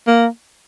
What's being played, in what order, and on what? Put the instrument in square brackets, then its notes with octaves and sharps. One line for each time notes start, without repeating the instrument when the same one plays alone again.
[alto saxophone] A#3